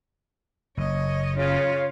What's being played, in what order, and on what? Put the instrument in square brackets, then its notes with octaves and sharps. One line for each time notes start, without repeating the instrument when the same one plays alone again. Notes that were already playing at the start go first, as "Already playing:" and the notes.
[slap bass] F#1 [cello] C#5 D#5
[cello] C#3 F4 [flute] C#5